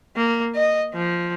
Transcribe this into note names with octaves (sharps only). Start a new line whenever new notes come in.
A#3
D#5
F3